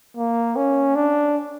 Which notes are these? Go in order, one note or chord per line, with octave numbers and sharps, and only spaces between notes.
A#3
C#4
D4